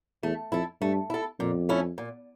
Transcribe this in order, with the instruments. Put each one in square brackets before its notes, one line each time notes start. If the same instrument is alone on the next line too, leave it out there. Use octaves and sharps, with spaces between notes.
[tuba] E2 [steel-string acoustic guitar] A3
[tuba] F2 [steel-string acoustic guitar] E4 A4
[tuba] G2 [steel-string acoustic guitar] A3
[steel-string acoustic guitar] E4 A4
[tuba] F2 [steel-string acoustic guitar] A#2
[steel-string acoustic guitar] A3 C#4 E4
A#2